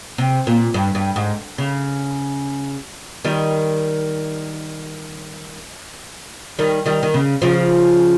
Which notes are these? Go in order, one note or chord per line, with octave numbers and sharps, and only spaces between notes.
C3
A#2
G2
G2
G#2
C#3
D#3 G3
D#3 G3
D#3 G3
D#3
C#3
C#3 F3